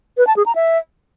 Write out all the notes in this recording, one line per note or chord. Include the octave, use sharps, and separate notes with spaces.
B4
A5
G#4
A#5
E5